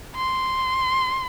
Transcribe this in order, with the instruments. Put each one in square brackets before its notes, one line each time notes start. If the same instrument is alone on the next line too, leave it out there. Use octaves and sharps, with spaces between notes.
[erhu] C6